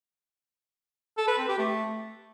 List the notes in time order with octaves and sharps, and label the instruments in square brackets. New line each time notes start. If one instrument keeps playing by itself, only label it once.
[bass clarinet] A4
B4
C4
G4
A3